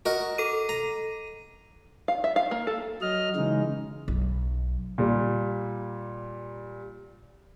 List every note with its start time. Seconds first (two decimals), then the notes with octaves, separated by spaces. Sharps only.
0.06 F#4 A#4 D#5
0.38 A4 D#7
0.69 A#5
2.08 F5
2.24 E5
2.36 F5
2.51 A#3
2.67 A4
3.02 F#3 D#5 F6
3.36 C#3 E3 G#3 D#4
4.08 B1
4.98 A#2 G3